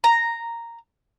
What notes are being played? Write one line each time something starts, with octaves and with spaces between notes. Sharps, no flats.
A#5